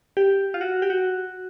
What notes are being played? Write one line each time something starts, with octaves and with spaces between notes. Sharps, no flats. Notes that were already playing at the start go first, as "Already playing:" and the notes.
G4
F4
F#4
G4
F#4